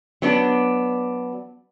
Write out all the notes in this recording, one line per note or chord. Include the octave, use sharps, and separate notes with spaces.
F#3 B3 D4